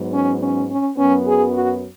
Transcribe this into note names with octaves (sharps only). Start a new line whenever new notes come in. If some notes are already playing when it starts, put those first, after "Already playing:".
Already playing: G#2 F#3 B3
C#4
C#4
C#4
F#2 F#3 B3 C#4
G#4
F#4